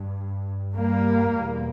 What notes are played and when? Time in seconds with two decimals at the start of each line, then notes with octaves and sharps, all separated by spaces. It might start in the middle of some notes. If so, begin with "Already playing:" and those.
Already playing: G2
0.76 G3 A#3
1.38 E2 B2